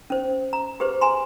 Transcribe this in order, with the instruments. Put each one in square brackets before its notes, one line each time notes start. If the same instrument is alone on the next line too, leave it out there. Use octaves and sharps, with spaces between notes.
[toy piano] C#4 C5
A#5
G4 G#4 B4 C5
G#5 A#5 C6